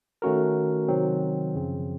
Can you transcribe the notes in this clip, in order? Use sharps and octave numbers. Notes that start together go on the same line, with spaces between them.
D#3 A3 C#4 F#4 A#4
C3 D#3 F#3 C4
F#2 C#3 F3 C4